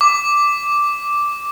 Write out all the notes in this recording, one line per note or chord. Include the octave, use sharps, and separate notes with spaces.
D6